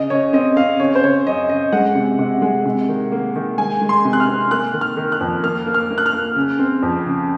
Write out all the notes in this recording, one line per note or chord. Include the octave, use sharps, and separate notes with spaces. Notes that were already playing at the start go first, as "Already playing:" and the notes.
Already playing: C#3 D#5
C#3 C#5
C4 D#5
C4 F5
C#3 C#5
C5
C#3 C#5
F#2 D#5
C#3 D#5
G#3 F#5
C3
C3
G#3
C3
D#3
A#3
D#3
G#3 G#5
G#3
C6
C3
F#6
F6
C4
A#3 F#6
D#3
F6
D#3
F#6
F2
A#3 F6
A#3
F6
A#3
F#6
F6
A#3
C#3
C4
F2
C#3